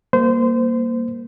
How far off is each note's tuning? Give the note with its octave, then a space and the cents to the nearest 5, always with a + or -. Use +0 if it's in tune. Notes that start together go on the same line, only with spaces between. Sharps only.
G3 +15 A#3 +0 C5 -25